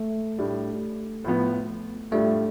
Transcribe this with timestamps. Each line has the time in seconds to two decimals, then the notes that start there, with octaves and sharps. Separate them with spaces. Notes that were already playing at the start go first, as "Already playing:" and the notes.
Already playing: A3
0.38 A2 G3 D4
1.24 A2 F3 B3
2.11 A2 G3 A3 D4 F4